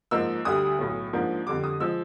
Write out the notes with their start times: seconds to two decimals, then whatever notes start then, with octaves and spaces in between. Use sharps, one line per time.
0.11 G#2 F3 A#3 D#4 E6
0.45 D2 D3 G3 D#6
0.79 B1 A2 F#3
1.13 G#2 F3 A#3 D4
1.46 F2 D3 G3 D6
1.64 D#6
1.80 F3 G#3 E6